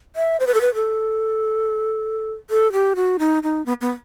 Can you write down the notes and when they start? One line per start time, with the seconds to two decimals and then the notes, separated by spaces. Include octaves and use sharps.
0.16 E5
0.40 C5
0.47 B4
0.54 A4
0.61 B4
0.75 A4
2.50 A4
2.73 G4
2.96 F#4
3.19 D#4
3.43 D#4
3.66 B3
3.81 B3